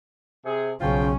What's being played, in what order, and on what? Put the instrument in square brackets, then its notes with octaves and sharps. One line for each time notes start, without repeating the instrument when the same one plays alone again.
[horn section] C3 G#4
[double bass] B1 C#4 [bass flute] C#3 [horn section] F3 F4 G5